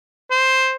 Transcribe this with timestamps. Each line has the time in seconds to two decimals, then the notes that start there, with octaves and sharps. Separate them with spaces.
0.31 C5